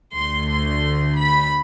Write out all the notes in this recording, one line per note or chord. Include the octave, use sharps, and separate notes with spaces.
D2 D3 A3 C6
C6
B5